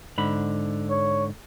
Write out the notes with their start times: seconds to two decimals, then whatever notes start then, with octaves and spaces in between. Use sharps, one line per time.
0.18 G#2 D3 B5
0.90 C#5